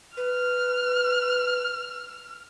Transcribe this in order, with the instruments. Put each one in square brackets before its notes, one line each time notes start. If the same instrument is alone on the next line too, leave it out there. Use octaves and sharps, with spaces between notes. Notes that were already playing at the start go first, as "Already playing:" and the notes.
[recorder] B4 [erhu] F6